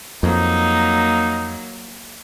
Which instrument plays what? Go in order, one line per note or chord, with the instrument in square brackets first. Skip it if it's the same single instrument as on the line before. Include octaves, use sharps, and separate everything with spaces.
[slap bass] F2 [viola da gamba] F#3 A#3 [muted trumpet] D#4